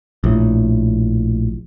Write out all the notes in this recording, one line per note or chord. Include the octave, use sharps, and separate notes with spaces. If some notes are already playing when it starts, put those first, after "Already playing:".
A#1 A2